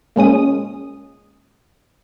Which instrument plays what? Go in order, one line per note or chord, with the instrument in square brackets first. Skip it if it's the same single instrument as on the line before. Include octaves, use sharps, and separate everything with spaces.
[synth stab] A#2 G#3 C#4 D#6